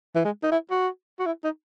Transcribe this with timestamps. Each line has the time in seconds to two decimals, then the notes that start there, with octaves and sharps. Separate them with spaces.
0.16 E3
0.25 G#3
0.43 D#4
0.52 E4
0.71 F#4
1.20 F#4
1.26 E4
1.44 D#4